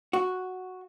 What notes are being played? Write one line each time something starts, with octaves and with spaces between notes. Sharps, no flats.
F#4